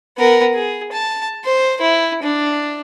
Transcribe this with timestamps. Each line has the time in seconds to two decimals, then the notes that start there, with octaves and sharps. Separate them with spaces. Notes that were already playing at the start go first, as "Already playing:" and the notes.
0.18 B3 A#4
0.54 G#4
0.92 A5
1.45 C5
1.81 E4
2.23 D4